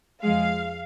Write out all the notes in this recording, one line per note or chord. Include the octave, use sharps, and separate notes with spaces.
F2 F3 G#3 F5